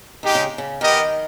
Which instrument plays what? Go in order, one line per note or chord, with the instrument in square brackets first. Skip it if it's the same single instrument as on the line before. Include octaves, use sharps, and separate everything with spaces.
[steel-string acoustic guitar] D#3 [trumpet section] G#3 D#4 G4
[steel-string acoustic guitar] C#3
C#3
[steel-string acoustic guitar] D#3 [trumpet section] B3 G4 A#4 D#5